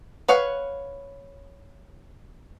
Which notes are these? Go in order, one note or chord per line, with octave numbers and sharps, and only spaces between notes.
B4 C#5 F5 F#5